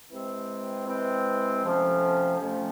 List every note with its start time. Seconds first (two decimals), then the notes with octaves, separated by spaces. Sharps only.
0.10 C3 E3 G#3 C4
0.86 C3 E3 G#3 C4
1.63 F2 C3 F3 A3 C#4
2.39 F2 C3 F3 A3 C#4